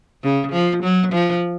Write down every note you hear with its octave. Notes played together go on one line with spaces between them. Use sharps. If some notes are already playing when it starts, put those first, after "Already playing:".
C#3
F3
F#3
F3